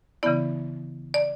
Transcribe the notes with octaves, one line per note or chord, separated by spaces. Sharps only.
C#3 E3 B3 E4 D5
D5